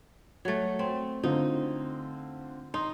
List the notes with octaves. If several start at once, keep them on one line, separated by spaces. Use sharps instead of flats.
F#3 A3
C4
D3 C4 D#4 F4
D#4 C6